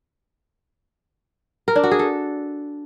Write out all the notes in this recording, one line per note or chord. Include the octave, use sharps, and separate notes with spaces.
A#4
D4
F#4
G#4
A4